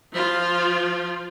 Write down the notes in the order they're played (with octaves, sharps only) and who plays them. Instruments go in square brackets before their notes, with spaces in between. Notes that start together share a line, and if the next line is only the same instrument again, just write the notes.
[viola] F3 F4